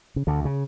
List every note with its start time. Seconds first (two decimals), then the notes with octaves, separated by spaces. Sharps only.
0.16 C#3
0.27 D2 D3
0.45 C#3